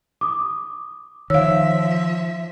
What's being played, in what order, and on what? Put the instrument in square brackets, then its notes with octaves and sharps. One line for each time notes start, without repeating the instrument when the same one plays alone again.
[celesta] D6 D#6
[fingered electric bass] D#3 [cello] F3 E5 [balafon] C#5 F5 [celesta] E6